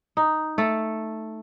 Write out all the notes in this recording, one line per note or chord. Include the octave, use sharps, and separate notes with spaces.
D#4
A3 A4